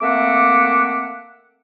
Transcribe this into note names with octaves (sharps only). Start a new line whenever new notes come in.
A3 A#3 C4 E5 F#5 D6